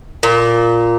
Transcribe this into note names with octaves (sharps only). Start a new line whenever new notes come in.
A#2